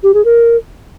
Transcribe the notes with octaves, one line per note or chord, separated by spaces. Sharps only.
G4
G#4
A#4